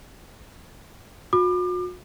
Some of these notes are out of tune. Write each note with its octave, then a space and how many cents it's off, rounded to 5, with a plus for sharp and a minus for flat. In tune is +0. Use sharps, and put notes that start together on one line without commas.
F#4 -45 D6 +35